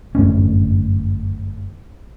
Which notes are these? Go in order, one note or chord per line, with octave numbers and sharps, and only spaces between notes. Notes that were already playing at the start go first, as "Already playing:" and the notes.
G1 F#2 A2 C#4